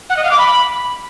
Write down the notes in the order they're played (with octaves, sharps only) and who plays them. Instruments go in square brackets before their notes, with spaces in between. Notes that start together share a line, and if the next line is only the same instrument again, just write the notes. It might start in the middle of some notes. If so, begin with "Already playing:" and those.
[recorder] F#5
D#5
F5
D6
B5